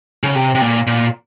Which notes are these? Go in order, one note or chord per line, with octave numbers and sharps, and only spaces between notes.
C#3
C3
C3
A#2
A#2